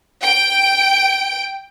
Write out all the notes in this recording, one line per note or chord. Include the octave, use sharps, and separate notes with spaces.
G5 D7